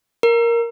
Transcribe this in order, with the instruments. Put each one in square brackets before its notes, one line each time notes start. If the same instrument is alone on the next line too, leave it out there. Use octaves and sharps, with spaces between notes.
[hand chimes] A#4